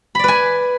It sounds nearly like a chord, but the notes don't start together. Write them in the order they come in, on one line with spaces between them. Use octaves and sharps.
B5 D5 B4 G#5